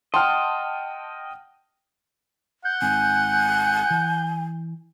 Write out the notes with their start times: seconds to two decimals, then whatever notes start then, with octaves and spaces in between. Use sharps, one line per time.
0.14 D#5 F#5 G5 A5 C6 F6
2.65 F#5 G6
2.82 G#1 G#2 C4 G#5
3.91 E3